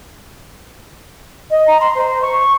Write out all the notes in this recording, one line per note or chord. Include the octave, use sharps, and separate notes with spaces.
D#5
A#5
C6
C5
C#6